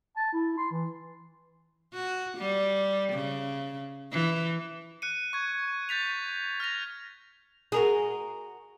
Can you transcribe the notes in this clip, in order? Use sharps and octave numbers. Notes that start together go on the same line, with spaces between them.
A5
E4
C6
E3
F#4
G3
C#3
E3
F#6 C#7 D#7
C#6 G#6
G6 A6 B6 F7
F6 G#6 A#6 F7
F#4 G#4 A#4 D#5